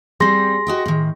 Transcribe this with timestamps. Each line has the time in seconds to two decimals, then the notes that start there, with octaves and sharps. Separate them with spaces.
0.20 G3 C4 G#4 C6 A#6
0.67 F#4 D#5 G5
0.86 A2 D#3